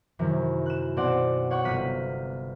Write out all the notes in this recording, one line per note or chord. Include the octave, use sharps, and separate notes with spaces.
F#2 C3 D#3 E3
F#6 E7
B2 C4 D5 F#5
C#5 F#5 G5 C#6
G1 C3 F5 F#6 B6 D#7